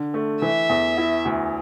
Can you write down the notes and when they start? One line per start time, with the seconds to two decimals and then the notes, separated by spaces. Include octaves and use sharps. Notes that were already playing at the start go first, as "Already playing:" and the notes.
Already playing: D3
0.14 A3
0.42 E3 E5
0.69 E2
0.97 E4
1.25 D2